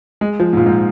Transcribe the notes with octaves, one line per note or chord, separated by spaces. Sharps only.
G#3
F3
G#2
A#2
G#2